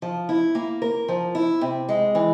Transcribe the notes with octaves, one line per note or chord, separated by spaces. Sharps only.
F3
E4
A#3
A#4
F3
E4
C3
G#3
E3